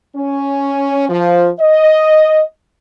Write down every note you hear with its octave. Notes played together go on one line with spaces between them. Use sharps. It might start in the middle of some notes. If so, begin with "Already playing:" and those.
C#4
F3
D#5